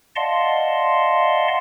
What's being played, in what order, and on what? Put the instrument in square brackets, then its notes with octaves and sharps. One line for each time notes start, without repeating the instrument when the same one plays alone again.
[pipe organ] D5 D#5 F5 F#5 A5 C6